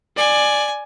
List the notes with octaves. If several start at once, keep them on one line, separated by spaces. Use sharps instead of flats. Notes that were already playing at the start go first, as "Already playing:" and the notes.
D5 G#5